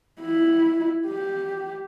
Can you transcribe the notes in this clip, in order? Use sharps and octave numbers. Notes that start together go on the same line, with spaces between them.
E4
G4